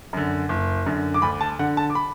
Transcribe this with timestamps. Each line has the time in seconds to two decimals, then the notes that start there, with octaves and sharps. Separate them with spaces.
0.13 F#2 D3
0.49 F#1
0.86 F#2 D3
1.14 D6
1.22 D2 B5
1.41 A5
1.59 D3 F#5
1.77 A5
1.90 D6
1.95 B5